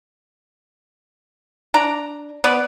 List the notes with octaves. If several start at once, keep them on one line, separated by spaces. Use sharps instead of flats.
D4 D5 A#5
B3 B4 D5